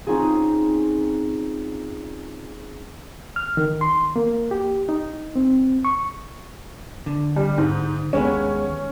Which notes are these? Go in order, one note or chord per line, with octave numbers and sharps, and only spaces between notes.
C4 C#4 D#4 F4 G#4
F6
D#3
C6
A#3
G4
D#4
C4
C#6
D3
G3
G#2
D#2 G#3 B3 C#4